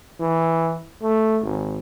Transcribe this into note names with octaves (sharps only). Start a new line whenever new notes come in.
E3
A3
G#1